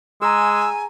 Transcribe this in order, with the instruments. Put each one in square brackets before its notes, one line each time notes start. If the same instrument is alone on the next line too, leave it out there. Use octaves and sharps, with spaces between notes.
[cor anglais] G#3 [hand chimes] G#4 A#5 [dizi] G#5 [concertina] E6